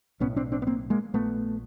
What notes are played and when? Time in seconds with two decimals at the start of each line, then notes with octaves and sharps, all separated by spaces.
0.20 B1 A2 B3 C#4
0.36 C4 D4
0.52 C4 D4
0.62 B3
0.67 A#3 C4
0.90 G#3 A#3
1.13 A#1 A#2 A3 B3